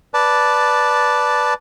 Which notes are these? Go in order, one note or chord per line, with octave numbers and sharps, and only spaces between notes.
B4 D5 A5